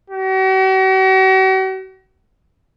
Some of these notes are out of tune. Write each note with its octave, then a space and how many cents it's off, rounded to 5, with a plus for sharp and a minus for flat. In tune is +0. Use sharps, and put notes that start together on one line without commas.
F#4 +45